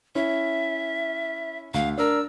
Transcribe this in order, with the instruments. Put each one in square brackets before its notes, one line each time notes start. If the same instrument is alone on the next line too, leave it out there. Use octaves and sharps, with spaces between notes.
[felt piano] C#4 E4 [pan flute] E5
[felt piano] D2 [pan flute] F5
[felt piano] D4 A#4 [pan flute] E6